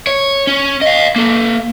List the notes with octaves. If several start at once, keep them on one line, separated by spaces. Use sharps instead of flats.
C#5
C#4
D#5 F5
A#3 A4